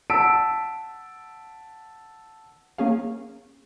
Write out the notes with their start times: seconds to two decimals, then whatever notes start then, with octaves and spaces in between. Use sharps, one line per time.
0.10 F#5 A5 E6 B6 D7
2.78 A#3 C#4 G#4 F5